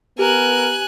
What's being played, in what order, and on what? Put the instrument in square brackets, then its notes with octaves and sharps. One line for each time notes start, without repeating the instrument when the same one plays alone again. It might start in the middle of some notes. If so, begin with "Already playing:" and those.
[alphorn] B3 [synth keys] G4 [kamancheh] A#4 [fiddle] G#5 F#6